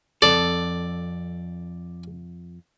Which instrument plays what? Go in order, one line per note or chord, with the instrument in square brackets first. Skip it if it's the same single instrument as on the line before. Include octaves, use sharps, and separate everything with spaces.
[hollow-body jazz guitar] F2 A4 [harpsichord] D5